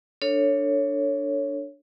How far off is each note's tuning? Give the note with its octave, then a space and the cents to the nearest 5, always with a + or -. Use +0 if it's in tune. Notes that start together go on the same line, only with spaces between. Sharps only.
D4 +0 A4 +30 C#5 +0